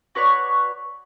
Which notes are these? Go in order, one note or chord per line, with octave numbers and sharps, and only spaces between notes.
F#4 B4 C#5 D5